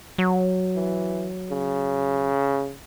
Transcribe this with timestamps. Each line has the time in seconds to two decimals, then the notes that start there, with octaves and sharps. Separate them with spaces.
0.18 F#3
0.75 E3
1.50 C#3